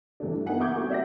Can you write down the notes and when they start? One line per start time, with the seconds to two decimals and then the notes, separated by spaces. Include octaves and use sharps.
0.20 G2 E3 A3 D4
0.34 E4
0.46 A#3 B3 D#4 E4 F#5 G#5
0.59 E5 C#6 D6 G6 G#6
0.76 G3 A#3 C4 F#4
0.90 D5 E5 F#5 A#6